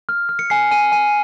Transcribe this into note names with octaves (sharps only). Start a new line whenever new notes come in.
F6
F6
C#7
G#5 C7
G#5 D#7
G#5 D#7